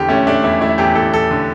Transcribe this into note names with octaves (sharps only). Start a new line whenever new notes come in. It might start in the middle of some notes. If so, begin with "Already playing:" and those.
Already playing: E2 D3 G4
A3 C#4
A3 D4
E2 E4
A3 E4
E2 G4
E2 A4
E2 A4
D3